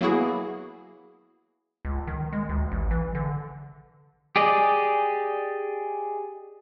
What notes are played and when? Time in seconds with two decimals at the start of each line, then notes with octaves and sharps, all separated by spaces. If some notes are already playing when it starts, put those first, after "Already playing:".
0.01 F#3 A#3 B3 E4 F#4 G#4
1.85 C#2
2.07 D#3
2.32 G#3
2.49 D2
2.72 A1
2.91 E3
3.15 D3
4.36 G4 G#4 D5 D#5